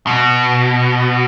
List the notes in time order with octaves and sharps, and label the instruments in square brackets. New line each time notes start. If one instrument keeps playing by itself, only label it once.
[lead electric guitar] B2